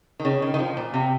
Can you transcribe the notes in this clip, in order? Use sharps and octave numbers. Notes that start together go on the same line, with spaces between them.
D#3
C#3
D#3
D#3
F3
A#2
C3